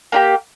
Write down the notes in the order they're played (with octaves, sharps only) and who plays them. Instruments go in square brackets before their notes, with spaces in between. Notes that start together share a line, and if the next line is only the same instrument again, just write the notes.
[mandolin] A#3 D#4 G4